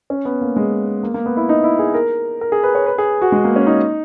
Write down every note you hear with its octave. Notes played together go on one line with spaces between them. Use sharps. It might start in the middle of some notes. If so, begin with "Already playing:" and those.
C#4
B3
A#3
G#3
A#3
A#3
B3
E4
D#4
E4
G#4
A#4
A#4
G#4
B4
C#5
B4
G#4
F#4
G#3
A#3
C#4
D#4